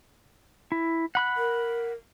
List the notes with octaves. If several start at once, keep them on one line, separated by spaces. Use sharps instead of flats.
E4
F#5 B5 F#6
A#4